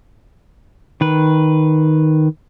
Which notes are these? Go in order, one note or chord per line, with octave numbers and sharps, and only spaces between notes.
D#3 B4